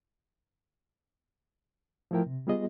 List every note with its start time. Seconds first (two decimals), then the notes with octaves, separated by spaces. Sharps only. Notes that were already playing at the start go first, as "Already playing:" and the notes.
2.11 F3 A3 E4 A#4 G5
2.26 C3
2.47 G3 B3 F4 G#4 D#5